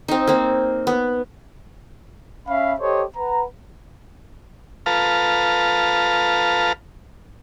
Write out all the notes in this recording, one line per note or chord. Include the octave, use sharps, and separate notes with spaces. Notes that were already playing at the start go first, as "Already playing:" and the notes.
C4 D#4
A#3 C4
B3
C#4 E5 F5 B5
G4 A4 C5 C#5 D#5
B4 F#5 A#5
F4 A4 B4 F5 A5 A#5